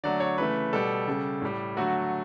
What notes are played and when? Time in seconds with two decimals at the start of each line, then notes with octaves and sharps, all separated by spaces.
0.04 D3 F#3 A3 D5
0.20 C#5
0.38 C#3 E3 A3 B4
0.73 B2 G3 A4
1.08 C#3 G3
1.42 A2 G3
1.77 D3 F#3 A3 F#4